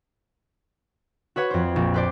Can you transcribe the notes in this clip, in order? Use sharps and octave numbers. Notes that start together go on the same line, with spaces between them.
F#4 B4 C#5 F#5
F2 C5
A#1
B4 C5 D5